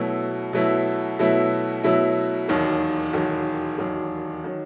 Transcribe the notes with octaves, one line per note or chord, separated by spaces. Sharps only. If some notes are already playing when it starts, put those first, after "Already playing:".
Already playing: B2 F#3 A3 E4
B2 F#3 A3 E4
B2 F#3 A3 E4
B2 F#3 A3 E4
E1 D#2 D#3 F#3
E1 D#2 D#3 F#3
E1 D#2 D#3 F#3
D#3 F#3